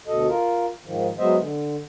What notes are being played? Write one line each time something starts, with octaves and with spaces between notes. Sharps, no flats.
D2 B2 A4 D#5
F4 A#4
G#2 D#3 F3
F#3 G#3 B3 C5 D#5 E5
D3